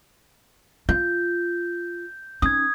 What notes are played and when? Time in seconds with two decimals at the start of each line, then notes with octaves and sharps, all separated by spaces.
0.89 F4 G6
2.42 C#4 D#4 D#6 G#6